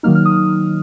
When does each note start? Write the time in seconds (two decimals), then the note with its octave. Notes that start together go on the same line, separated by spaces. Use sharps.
0.03 D#3 F#3 A#3 D#4 F6
0.15 F6
0.25 D#6